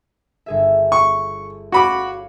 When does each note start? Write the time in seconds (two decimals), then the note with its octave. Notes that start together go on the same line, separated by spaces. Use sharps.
0.46 G1 G#4 E5
0.92 C#6
1.72 F#4 C#5 F5 B5 D6